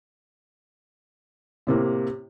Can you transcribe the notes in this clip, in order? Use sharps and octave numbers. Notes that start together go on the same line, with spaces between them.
A2 C3 A#3